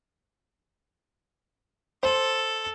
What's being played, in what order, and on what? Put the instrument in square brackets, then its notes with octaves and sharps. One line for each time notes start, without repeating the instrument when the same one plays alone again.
[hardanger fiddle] A4 [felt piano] C5